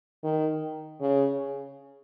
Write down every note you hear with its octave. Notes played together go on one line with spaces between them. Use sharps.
D#3
C#3